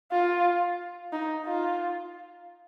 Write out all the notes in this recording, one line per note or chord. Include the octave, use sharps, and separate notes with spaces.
F4
D#4
F4